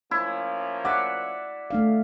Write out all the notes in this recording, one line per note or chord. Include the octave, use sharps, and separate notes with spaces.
F3 A#3 C#4 E4
D5 E5 F#5
A3 D4 F5